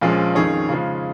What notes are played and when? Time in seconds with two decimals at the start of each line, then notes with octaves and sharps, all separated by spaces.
0.01 A#1 A#2 F3 G#3 C#4
0.35 F2 D#3 C#4 G#4 C#5
0.69 C#3 F3 G#3